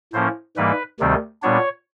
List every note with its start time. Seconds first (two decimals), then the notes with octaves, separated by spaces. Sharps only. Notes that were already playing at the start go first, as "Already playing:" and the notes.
0.13 A2 F3 A#3 C#4 C5
0.57 G#2 E3 G3 A#3 B4
1.00 D2 C3 D#3 G3 C4
1.42 A#2 G3 B3 D4 C#5